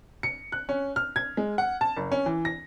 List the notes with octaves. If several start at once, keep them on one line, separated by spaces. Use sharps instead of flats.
C#7
F#6
C#4
F6
G#6
G#3
F#5
A5
F#1
C#4
E3
A#6